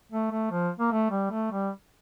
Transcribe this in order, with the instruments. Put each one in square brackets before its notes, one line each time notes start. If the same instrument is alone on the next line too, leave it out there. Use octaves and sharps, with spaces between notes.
[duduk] A3
A3
F3
A#3
A3
G3
A3
G3